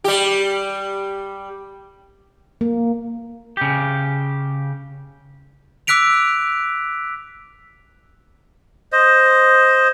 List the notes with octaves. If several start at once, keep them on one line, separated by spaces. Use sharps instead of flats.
G3 G4
A#3
C#3 G4
D6 E6 F#6 B6 D7 F7
C5 D#5